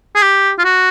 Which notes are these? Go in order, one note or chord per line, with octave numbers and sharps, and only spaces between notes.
G#4
G4
F4
F#4